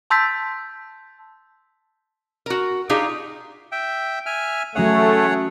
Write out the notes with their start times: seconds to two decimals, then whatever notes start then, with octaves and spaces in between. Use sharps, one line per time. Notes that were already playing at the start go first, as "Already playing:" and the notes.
0.10 A5 C6 E6 G6 A6 B6
2.46 F#4 A#4
2.89 D4 D#4 F4 G4 G#4
3.72 E5 G5
4.26 E5 G#5 F6
4.75 F#3 A3 C#4 G#4 C#5 E5 F#5